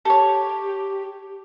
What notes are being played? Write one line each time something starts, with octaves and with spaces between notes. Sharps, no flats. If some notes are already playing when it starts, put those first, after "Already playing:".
G4 A4 C#5